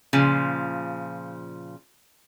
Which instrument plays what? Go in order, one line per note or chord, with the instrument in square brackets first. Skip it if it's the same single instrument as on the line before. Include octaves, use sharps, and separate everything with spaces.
[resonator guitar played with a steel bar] A#2 C#3 F3